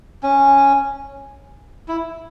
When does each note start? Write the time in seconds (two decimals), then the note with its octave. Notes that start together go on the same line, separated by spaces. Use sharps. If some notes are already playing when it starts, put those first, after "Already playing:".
0.23 C#4
1.88 E4